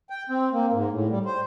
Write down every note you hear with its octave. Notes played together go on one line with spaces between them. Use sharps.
G5
C4
A#3
G#2
A2
G3
C5